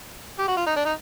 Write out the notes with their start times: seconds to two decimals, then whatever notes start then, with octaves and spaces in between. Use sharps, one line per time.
0.39 G4
0.48 F#4
0.57 F4
0.66 D#4
0.76 D4
0.85 D#4